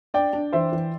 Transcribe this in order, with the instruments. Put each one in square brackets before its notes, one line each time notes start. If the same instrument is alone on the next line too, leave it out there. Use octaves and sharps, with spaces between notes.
[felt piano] D4 [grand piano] D5 G5
[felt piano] D4
[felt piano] E3 [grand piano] C5 E5
[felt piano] E3